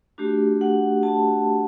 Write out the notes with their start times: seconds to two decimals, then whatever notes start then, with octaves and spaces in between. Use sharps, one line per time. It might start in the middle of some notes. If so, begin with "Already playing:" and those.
0.18 A3 D4 F#4 G4
0.61 F#5
1.03 A5